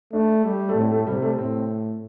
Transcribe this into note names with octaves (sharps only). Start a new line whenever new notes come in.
A3 D4
G3
A3
A2 C4
A3
C3 G3
A3
A2 C4